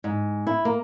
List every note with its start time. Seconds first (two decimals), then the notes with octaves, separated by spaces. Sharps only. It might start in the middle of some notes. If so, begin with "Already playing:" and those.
0.04 G#2
0.47 E4
0.65 A#3